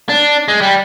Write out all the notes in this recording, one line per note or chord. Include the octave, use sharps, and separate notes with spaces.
D4
G#3
G3